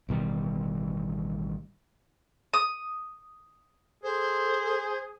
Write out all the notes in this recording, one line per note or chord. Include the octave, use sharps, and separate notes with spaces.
A1 B2 D#3 G3
D#6
G#4 A4 C5